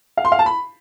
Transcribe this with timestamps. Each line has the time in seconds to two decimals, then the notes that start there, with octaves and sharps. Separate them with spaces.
0.17 F5
0.25 C6
0.32 F5
0.39 A5
0.46 B5